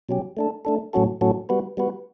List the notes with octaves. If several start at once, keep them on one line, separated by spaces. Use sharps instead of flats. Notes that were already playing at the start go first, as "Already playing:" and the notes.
B2 F#3 C#4 G4
A3 D4 A4
A3 D4 A4
A2 F#3 C#4 F#4 A4
A2 F#3 C#4 F#4 A4
G3 B3 F#4 B4
G3 B3 F#4 B4